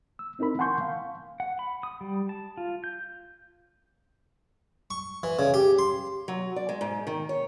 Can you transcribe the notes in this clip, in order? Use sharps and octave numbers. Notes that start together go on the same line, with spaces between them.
E6
C4 D#4 E4 A#4 B5
F#5 G#5 A5 C6 C#6 G6
F5
F#5
B5
D#6
G3
A5
F4
G6
C#6
E3
C#3
G4
C6
F#3
D5
G#3
G#2
D#3
C#5